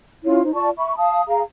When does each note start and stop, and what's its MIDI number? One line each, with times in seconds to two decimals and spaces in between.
0.24 0.42 61
0.24 0.42 64
0.24 0.42 65
0.24 0.42 73
0.43 0.51 63
0.43 0.51 72
0.54 0.70 65
0.54 0.70 74
0.54 0.70 81
0.54 0.70 85
0.78 0.96 76
0.78 0.96 83
0.78 0.96 85
0.97 1.21 77
0.97 1.21 81
0.97 1.21 87
1.27 1.41 68
1.27 1.41 77
1.27 1.41 82